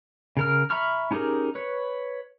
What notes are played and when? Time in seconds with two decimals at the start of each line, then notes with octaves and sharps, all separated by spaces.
0.37 C#3 A#4 F6
0.70 E5 A#5 B5 C#6 F6
1.11 C#4 D#4 G4 G#4 A#4
1.55 B4 C#5